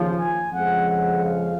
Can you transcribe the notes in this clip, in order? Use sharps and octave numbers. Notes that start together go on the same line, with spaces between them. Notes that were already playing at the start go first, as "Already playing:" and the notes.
Already playing: D#2 C#3 F3
G#5
F2 C#3 F3 G#3 F#5
F#5
F5